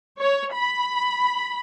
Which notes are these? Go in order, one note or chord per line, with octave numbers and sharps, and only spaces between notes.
C#5
B5